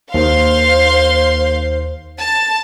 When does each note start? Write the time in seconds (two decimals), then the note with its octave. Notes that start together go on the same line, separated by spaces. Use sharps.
0.14 D#2 C5 F5 C6
2.18 A5